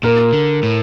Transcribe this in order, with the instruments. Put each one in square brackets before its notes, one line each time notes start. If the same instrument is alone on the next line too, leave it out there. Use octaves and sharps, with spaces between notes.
[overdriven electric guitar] A#2 [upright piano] A#4
[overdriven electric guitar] D3
A2